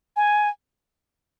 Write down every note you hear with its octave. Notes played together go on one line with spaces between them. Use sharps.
G#5